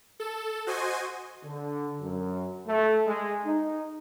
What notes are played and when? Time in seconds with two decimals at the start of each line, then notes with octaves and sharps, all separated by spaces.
0.20 A4
0.67 F#4 C5 D#5 G#5
1.44 D3
2.00 F#2
2.67 A3
3.06 G#3
3.44 D#4